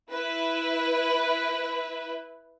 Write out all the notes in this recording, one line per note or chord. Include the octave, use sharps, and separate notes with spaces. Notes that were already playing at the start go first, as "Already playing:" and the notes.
E4 B4